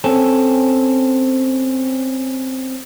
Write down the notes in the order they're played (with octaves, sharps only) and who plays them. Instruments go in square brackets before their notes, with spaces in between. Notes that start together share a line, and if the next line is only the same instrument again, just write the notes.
[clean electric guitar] C4 C#4 A4